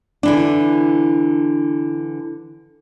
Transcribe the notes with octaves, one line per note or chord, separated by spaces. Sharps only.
D3 E3 D4